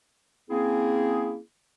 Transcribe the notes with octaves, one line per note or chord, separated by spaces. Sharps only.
A#3 C4 C#4 E4 G#4